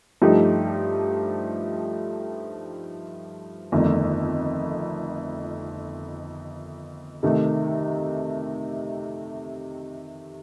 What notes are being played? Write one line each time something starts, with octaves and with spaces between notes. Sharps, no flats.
G2 F3 A3 D#4 G4
G1 F2 D#3 A3
C3 D#3 A3 D#4